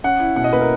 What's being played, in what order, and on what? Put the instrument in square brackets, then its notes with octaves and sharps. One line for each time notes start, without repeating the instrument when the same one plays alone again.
[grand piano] C#4 F#5
E4
B2 F#5
D#5
A#3 B4
A#4